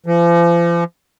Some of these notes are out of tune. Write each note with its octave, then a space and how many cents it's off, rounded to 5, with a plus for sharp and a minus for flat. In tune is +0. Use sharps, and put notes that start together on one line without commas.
F3 -40